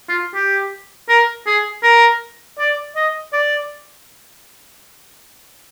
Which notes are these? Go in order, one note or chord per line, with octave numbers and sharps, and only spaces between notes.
F4
G4
A#4
G#4
A#4
D5
D#5
D5